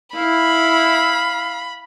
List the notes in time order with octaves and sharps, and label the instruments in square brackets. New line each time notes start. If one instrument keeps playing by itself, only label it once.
[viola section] E4 [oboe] F5 [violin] B5